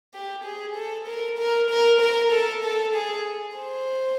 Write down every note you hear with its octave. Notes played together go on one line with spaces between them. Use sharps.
G4
G#4
A4
A#4
A#4
A#4
A#4
A4
A4
G#4
C5